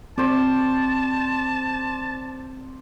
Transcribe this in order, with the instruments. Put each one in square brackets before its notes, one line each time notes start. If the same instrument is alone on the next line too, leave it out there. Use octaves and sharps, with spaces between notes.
[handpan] C4 [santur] C5 D5 [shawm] A5